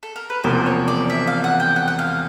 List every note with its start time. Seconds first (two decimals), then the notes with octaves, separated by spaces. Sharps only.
0.03 A4
0.16 A#4
0.30 B4
0.44 E1 E2 C3 F3 A#3 C5
0.66 C#5
0.88 D5
1.10 E5
1.27 F5
1.44 F#5
1.60 G5
1.76 F#5
1.88 F#5
1.99 F5